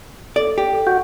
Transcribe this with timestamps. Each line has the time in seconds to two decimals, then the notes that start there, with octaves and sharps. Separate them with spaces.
0.36 A4 D5
0.58 G4
0.73 A4
0.87 F#4 G6